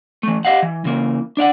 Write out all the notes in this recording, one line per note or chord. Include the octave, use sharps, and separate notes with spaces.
E3 A3
G4 G#4 D#5 F5 F#5
E3
C#3 E3 A#3
D4 D5 F5 F#5